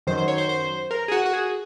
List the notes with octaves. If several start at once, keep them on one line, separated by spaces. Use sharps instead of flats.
F#2 D#3 F#3 C5
C5
C#5
C5
C5
A#4
G#4
F#4
F#4
G#4